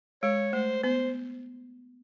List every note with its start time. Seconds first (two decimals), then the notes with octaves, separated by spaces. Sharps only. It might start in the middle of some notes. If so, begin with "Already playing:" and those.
0.23 G#3 C#5
0.53 A3 C5
0.83 B3 C5